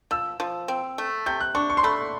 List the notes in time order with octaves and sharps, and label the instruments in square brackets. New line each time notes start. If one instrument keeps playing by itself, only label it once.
[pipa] F3 [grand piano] E6
[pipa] F3
C4
A3
[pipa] C3 [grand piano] G6
[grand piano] F#6
[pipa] D4 [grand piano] C#6
[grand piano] C#6
C6
[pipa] A3 [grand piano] B5